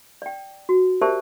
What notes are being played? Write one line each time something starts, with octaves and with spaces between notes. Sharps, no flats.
D5 G5
F#4
G4 A#4 C5 D5 E5 A5